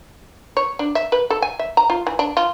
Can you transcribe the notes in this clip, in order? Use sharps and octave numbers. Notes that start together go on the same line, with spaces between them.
C#5
D4
E5
B4
A4
G#5
E5
A#5
F4
E3
D4
F4